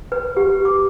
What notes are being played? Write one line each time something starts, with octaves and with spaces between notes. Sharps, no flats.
B4
G4
D6